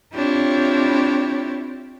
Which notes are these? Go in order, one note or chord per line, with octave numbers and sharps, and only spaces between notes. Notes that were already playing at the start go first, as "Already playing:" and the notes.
C4 D4 E4 F4 G4 C#5